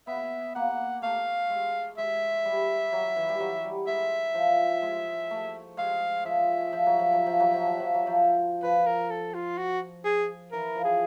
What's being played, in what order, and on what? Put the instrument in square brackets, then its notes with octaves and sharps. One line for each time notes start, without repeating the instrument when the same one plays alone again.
[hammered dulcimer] B3 [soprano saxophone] E5
[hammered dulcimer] A#3 [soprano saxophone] F#5
[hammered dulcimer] A3 [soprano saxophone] F5
[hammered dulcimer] G#3
[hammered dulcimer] G#3 [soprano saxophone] E5
[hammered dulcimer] G3
F#3
E3
G3
F#3
G3
[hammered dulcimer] G#3 [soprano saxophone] E5
[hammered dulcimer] F3
G#3
A3
[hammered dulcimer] G#3 [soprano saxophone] F5
[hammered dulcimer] F3 [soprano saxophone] E5
[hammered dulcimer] F3
F#3
F3
F#3
F3
F#3
F3
F#3
F3
F#3
F3
[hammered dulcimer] F3 [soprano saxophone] B4
[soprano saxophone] A#4
A4
F4
F#4
G#4
[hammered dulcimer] E3 [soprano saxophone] A#4
[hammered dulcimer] F3
[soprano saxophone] G#4